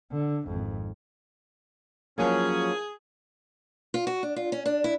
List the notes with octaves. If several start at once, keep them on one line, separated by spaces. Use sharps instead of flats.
D3
G#1 F2
F3 F#3 A#3 C#4 G#4
F4
F#4
D4
F4
C#4
D4
E4